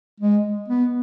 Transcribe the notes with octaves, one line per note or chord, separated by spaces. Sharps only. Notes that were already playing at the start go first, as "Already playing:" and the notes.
G#3
B3